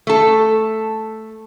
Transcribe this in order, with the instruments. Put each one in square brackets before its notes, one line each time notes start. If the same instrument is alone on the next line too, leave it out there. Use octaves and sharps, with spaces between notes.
[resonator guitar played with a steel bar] A3 A4